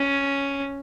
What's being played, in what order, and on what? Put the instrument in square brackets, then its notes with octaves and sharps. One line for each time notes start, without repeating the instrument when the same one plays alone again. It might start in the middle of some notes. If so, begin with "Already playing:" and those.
Already playing: [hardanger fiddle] C#4